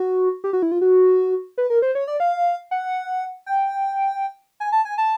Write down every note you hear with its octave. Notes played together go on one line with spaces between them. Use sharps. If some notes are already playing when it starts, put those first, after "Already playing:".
Already playing: F#4
G4
F#4
E4
F4
F#4
B4
A#4
C5
C#5
D5
F5
F#5
G5
G#5
A5
G#5
A5